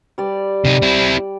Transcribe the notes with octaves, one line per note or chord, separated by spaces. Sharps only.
G3 D5
C3 D#4
C4 E4